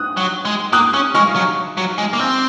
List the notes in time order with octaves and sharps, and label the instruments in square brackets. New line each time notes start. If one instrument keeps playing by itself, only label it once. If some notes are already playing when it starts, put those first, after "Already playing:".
Already playing: [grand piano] D#6 F#6
[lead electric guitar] F#3
G#3
[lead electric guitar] A#3 [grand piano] D#6 F#6
[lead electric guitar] C#4
[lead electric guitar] G#3 [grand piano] C#6 F6
[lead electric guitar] F#3
F#3
G#3
A#3
C4